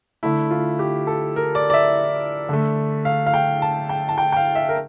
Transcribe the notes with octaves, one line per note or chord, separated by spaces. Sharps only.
D3 A3 E4
F4
G4
A4
A#4
D5
D5
E5
D3 A3
F5
F5
G5
A5
G5
A5
G5
G5
F5
E5
A#4